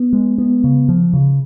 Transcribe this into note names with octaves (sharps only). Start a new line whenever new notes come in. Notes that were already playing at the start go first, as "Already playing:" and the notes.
Already playing: B3
G#3
B3
C#3
F3
C#3